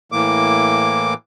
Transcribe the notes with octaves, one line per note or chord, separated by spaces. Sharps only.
A2 E3 A#3 D6